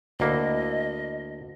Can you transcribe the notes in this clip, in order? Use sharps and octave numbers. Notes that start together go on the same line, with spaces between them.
D2 A#3 E4 D#5